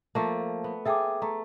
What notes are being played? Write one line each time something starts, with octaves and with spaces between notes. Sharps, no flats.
F3 A3 A#3 A5
B3
G#4 A4 E5 G5 D6
A3 A#5